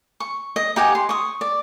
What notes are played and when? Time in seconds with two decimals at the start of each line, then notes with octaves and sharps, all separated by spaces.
0.20 C#6
0.56 D#5
0.76 D#4 G4 F#5 G#5
0.95 C6
1.09 C#6 D#6
1.41 D5